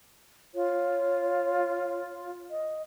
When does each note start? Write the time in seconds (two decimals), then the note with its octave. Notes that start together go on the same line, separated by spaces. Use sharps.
0.55 F4 C#5
2.51 D#5